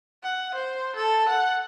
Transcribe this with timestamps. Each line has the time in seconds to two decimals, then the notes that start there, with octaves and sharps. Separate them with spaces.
0.23 F#5
0.54 C5
0.96 A4
1.28 F#5